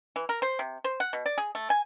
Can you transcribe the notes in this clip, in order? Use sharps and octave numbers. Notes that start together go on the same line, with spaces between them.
E3
A#4
C5
C3
C5
F#5
B2
D5
G#4
A3
G#5